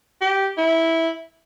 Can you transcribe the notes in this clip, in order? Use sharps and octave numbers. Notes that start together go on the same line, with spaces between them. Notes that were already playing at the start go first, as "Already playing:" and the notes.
G4
E4